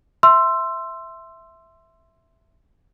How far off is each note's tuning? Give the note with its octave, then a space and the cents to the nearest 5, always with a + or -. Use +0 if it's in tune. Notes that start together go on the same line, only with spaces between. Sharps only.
E5 +0 C6 +0 E6 +20